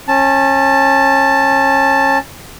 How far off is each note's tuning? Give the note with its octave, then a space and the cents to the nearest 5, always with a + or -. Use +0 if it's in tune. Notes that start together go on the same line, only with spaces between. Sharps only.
C#4 -30 A5 +0